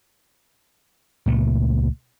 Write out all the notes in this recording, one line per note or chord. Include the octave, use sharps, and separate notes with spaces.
C#2 A#2 A3